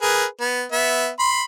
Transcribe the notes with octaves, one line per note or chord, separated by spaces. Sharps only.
G#4 A#4 B4
B3
B3 E5
B5 C6